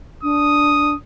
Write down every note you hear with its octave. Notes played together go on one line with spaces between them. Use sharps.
D4 D#6